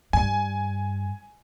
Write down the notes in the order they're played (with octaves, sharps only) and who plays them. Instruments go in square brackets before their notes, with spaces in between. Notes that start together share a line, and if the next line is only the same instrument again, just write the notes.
[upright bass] G2 [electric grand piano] G#5